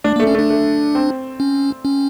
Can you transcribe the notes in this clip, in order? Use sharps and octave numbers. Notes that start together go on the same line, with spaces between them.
A3 D4
A#3
A3
C#4
A3 D4
A3
C4
C#4
C#4